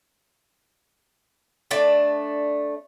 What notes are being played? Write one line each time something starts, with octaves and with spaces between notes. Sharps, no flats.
A3 D4 D5 A5